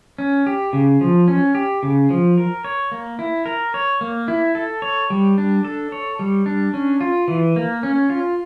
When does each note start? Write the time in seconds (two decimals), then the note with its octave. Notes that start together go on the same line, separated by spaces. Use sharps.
0.18 C#4
0.46 G4
0.73 C#3
1.01 F3
1.28 C#4
1.55 G4
1.83 C#3
2.10 F3
2.38 A#4
2.64 C#5
2.92 A#3
3.19 E4
3.46 A#4
3.74 C#5
4.01 A#3
4.28 E4
4.55 A4
4.82 C#5
5.10 G3
5.38 D4
5.65 A4
5.92 C#5
6.19 G3
6.46 D4
6.74 C#4
7.01 F4
7.28 E3
7.56 A#3
7.83 C#4
8.10 F4